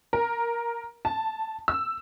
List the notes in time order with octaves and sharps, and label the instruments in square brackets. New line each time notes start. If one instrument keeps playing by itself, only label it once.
[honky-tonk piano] A#4
A5
E6